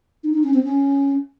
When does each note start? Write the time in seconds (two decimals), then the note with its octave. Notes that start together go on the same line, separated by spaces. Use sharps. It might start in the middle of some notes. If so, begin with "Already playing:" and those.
0.23 D#4
0.33 D#4
0.44 C#4
0.54 C4
0.64 C#4